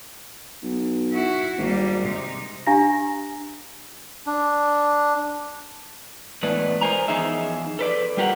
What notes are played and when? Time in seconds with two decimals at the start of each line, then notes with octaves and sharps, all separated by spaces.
0.63 B1
1.12 E4 F#4
1.58 G#1 G3 A#3
2.02 C3 D#4
2.67 D4 G4 F5 G#5 A#5 A#6
4.26 D4
6.43 E2 A2 G#3 A3 B4 D5
6.81 A#4 C5 G#5 A#5
7.08 E2 F3 D#4 G#4 E5
7.79 A4 B4 D5
8.17 G3 F4 G4 A#4 F#5